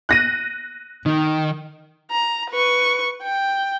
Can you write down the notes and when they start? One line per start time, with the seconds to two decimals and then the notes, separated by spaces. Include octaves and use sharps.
0.09 F#6 A#6 D#7
1.06 D#3 D#4
2.11 A#5
2.50 B4 C#6
3.22 G5